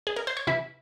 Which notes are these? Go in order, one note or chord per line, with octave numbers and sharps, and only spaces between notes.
G#4
A#4
C5
C#5
C3 E3 E4 E5